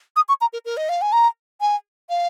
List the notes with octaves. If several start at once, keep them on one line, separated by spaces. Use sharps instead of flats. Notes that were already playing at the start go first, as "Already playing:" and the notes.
D#6
C#6
A#5
A#4
A#4
D#5
F5
G#5
A#5
G#5
F5